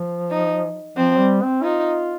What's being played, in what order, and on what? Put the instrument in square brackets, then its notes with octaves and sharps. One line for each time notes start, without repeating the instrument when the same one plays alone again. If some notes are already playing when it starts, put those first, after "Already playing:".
Already playing: [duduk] F3
[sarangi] D#4
[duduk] F3 [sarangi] C4
[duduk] G3
C4
[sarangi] D#4 [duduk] F4